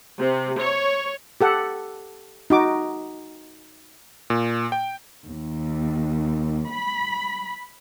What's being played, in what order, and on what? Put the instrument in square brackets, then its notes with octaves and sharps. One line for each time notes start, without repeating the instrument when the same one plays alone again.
[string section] C3
C#5
[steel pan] G4 A4 F#5
D#4 F#4 D6
[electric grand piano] A#2
G5
[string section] D#2
B5